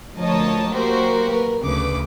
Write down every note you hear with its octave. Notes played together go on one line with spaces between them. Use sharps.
D2 F3 A#4 C#5 D#5 A5
F#3 A#3 F#4 G4 A#4 C5
A#4 B4
D2 C#3 B4 D6